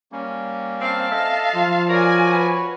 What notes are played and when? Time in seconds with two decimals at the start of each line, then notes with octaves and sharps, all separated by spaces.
0.12 G3 A#3 C#4
0.81 C4 F5 A5
1.11 A4 D#5 E5
1.55 F3 F4
1.89 F#4 A#4 C#5 D5 G#5
2.33 B4